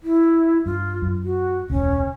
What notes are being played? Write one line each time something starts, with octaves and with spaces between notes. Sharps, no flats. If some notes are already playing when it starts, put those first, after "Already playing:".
E4
G2 F4
F#2
F#4
E1 C#2 C#4